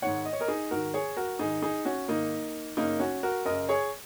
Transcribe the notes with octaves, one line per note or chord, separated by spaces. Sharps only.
G#2 D#3 C#5 F#5
D#5
C#5
A#4 D#5
D#4 G#4
G#2 D#3 F#4 A#4
G#4 C#5
F#4 A#4
G#2 D#3 D#4 G#4
D#4 G#4
C#4 F#4
G#2 D#3 A#3 D#4
F#2 C#3 A#3 D#4
C#4 F#4
F#4 A#4
F#2 C#3 A#4 D#5
G#4 C#5